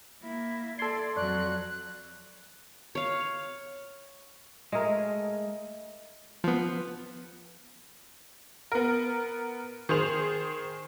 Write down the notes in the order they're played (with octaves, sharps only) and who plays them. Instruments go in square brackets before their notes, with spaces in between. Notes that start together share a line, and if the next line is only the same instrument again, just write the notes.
[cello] A#3 E4
[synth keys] A4 C6 [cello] D5 [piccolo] G#6
[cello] F2 F#3 [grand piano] D5 C#6 [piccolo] F#6
[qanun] C#5 F5
[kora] G#3 A3 G#4 A#4
[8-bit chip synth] F3 B3
[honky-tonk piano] B3 A#4
D#3 G#4 C5 F7